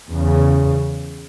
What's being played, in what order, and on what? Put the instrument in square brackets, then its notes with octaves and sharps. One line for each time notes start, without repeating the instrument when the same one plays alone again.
[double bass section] E2 C#3